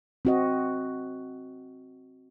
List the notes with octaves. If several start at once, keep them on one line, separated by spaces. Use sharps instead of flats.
C4 F#4 D#5